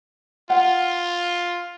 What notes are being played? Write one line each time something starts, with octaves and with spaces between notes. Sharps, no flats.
F4 F#5